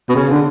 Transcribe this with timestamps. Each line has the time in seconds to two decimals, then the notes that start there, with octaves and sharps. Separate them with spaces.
0.09 B2
0.15 C#3
0.29 D3